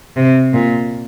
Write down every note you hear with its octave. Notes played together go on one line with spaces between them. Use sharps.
C3
A#2